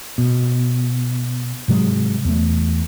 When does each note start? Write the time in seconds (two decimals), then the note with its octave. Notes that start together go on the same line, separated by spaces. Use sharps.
0.18 B2
1.68 G#2 C3 F#3 G#3
2.25 E2 A3